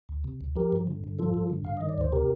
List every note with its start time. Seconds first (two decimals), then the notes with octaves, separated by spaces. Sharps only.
0.09 D2
0.24 C3
0.41 D2
0.56 F3 G4 A#4
0.72 G2
0.87 D3
1.04 G2
1.19 F3 F4 A4
1.34 G2
1.50 D3
1.65 G2 F5
1.77 D#3 D#5
1.89 D5
1.98 D2 C5
2.12 C3 G4 A#4